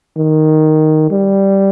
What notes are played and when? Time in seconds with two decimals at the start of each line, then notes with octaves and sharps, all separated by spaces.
0.17 D#3
1.11 G3